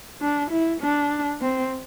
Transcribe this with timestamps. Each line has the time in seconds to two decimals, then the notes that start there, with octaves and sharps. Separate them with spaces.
0.21 D4
0.51 E4
0.81 D4
1.41 C4